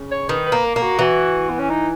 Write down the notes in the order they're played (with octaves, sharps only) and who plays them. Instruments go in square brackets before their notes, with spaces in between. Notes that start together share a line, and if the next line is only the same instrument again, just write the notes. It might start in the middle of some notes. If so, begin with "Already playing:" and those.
Already playing: [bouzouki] C#3
[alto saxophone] C#5
[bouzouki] D#3 [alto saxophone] B4
[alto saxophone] B4
[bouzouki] A#3
[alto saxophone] A#4
[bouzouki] A#3
[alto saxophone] F#4
[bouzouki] E3 [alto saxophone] F#4
[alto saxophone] B3
C#4
D#4